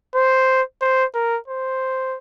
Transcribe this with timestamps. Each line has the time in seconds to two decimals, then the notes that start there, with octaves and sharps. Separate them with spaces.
0.15 C5
0.81 C5
1.14 A#4
1.48 C5